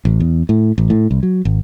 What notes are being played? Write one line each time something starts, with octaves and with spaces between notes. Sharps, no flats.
A1
E2
A2
A1
A2
C2
F#3
G#1